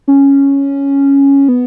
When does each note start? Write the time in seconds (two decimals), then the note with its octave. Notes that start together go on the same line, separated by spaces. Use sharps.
0.08 C#4
1.48 B3